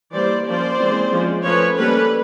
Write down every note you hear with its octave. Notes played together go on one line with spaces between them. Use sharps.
E3 G3 A#3 C5 D5
F3 A#3 C#4 C5 D5
E3 G#3 C4
F3 G#3 C#4
F3 A3 C#4 B4 C#5
G3 A#3 C#4 A4 B4